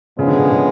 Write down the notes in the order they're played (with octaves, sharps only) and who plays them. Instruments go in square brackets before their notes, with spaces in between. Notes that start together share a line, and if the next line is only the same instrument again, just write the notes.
[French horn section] A#2 F3 G#3 B3 [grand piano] C#3
[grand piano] D3
C#3
C#3